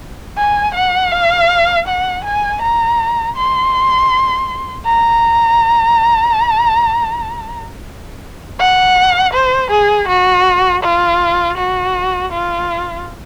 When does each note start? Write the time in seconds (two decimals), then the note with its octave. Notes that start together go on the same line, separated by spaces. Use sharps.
0.38 G#5
0.75 F#5
1.12 F5
1.87 F#5
2.24 G#5
2.62 A#5
3.36 C6
4.86 A#5
8.59 F#5
9.34 C5
9.71 G#4
10.08 F#4
10.83 F4
11.58 F#4
12.32 F4